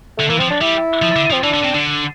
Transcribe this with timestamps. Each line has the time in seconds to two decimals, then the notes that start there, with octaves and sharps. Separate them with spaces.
0.17 D3 A3
0.28 E3 A#3
0.39 F3 C4
0.50 D4
0.61 G3 E4
1.02 F3
1.16 D3
1.30 F3 C4
1.43 E3 D4
1.54 D3
1.64 C3
1.75 D3